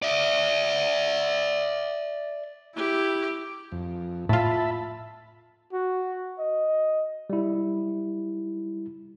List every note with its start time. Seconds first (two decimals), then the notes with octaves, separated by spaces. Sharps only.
0.03 D5 E5
2.76 E4 G4
3.72 F2
4.29 A2 F4 E5 A5 B5
5.73 F#4
6.39 D#5
7.30 G3 E4